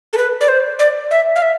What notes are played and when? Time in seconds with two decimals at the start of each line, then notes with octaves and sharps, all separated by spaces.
0.13 A4
0.18 B4
0.41 D5
0.48 C5
0.79 D5
1.11 E5
1.36 F5
1.42 E5